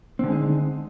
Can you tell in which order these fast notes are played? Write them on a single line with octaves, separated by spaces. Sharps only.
C4 D3 G#3 D#4